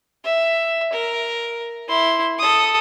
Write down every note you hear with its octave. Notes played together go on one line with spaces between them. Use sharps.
E5
A#4
E4 C6
A4 D#6